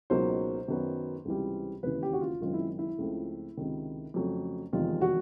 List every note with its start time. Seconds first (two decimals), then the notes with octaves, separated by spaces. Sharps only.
0.10 C#2 B2 F#3 A#3 D#4 C5
0.68 F#2 D#3 F#3 B3
1.25 C#2 C3 E3 G3
1.83 E1 D#2 C#3 E3 B4
2.03 G4
2.13 F#4
2.21 F4
2.41 F#1 F#2 D#3 G#3 C4 F4
2.53 E4
2.79 E4
2.98 C#2 C#3 F3 A3 C4
3.57 C#2 C3 D#3
4.14 F2 C#3 F#3 A3
4.73 F1 E2 C3 D#3 G#3 F4
5.01 F#4